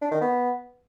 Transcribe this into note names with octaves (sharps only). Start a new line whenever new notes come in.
D4
D#3
B3